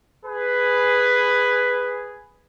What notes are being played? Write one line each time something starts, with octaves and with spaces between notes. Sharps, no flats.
G#4 B4